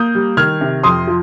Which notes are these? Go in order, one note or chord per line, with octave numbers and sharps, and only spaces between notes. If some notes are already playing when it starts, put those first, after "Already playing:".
Already playing: A#3 D#6 G6
G3
D#3 F6 G#6
C3
F2 C6 D#6
F3